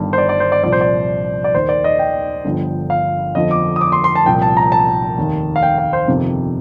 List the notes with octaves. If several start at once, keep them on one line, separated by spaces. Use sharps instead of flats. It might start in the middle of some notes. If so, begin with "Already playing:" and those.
Already playing: G1 G2 D#3
C5
D5
D5
C5
D5
C2 A#2 F3 D5
C5
D5
D5
D#2 D#3 C5
D5
D#5
G5
G1 G2 D3 F3
F5
G1 F2 D3 F3 D#5
D6
D#6
D6
C6
C6
A5
C2 A#2 F3 G5
A5
A#5
A5
F1 D#2 D#3
F5
G5
F5
C5
G1 F2 C3 D#3